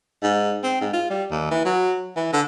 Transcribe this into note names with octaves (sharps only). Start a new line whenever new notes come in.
G#2
C4
G#2
F4
G3
D#2
E3
F#3
E3
D3